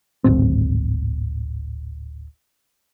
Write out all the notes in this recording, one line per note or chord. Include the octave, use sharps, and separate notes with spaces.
D1 G#1 C4